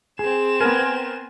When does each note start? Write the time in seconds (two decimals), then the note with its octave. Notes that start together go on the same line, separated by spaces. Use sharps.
0.19 C4 G#4 E7
0.60 B3 A#4 G#5